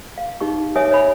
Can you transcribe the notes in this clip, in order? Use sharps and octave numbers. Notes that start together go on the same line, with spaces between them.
F5
D#4 G4 C#6
C#5 E5 G#5 D#6
C#5 B5